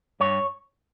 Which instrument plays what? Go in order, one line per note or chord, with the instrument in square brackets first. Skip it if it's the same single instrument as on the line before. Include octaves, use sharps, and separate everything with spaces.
[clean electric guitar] G2 C#5